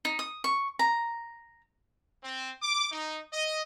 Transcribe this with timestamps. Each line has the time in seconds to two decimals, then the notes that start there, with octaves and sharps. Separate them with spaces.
0.05 D#4
0.19 D#6
0.44 C#6
0.79 A#5
2.23 C4
2.62 D6
2.92 D#4
3.33 D#5